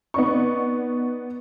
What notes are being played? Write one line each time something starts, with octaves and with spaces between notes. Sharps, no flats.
B3 D#4 D5 C#6